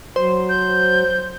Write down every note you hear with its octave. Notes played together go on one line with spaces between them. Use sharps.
F#3 C5
G6